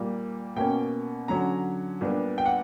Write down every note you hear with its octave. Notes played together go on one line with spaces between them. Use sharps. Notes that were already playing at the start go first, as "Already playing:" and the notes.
Already playing: A#2 G3 A#3
B2 A#3 C#4 G5
D3 F#3 C#4 A#5
A#2 G3 B3 D4
G5
F#5